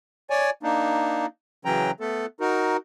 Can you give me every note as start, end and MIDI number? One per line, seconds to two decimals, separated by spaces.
0.30 0.50 73
0.30 0.50 74
0.30 0.50 80
0.63 1.26 58
0.63 1.26 62
0.63 1.26 63
1.65 1.91 49
1.65 1.91 52
1.65 1.91 54
1.65 1.91 61
1.65 1.91 79
1.65 1.91 82
2.00 2.26 57
2.00 2.26 59
2.00 2.26 69
2.40 2.77 63
2.40 2.77 66
2.40 2.77 70